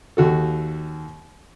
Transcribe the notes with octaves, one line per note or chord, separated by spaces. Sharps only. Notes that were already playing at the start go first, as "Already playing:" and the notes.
D#2 F#4 A4